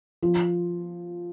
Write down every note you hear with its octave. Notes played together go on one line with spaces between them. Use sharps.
F3